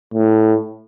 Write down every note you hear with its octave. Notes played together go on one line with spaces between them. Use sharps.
A2